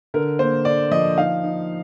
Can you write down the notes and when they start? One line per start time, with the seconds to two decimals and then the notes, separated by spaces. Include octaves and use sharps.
0.14 D3 A#4
0.39 A#3 C5
0.65 D3 D5
0.91 F3 D#5
1.17 D#4 F5
1.44 D#4